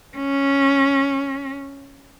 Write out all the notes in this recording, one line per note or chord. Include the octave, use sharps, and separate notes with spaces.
C#4